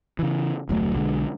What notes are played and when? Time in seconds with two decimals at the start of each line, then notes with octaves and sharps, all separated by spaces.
0.19 C#3 E3
0.69 F1 D2 F#3 A3
0.95 B1 D3 G#3